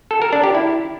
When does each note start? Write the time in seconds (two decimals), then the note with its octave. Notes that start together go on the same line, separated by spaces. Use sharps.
0.11 A4
0.22 A#4
0.33 D4
0.44 G4
0.55 E4